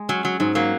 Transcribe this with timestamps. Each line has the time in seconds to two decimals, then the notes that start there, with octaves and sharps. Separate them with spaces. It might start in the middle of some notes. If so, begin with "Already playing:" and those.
Already playing: G#3
0.09 F#3 C#4
0.25 F#3
0.40 G#2 F#3
0.55 F#3 A#3